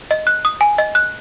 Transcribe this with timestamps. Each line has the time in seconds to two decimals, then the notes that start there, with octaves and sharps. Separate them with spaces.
0.11 D#5
0.27 F#6
0.45 D#6
0.61 G#5
0.78 D#5
0.95 F#6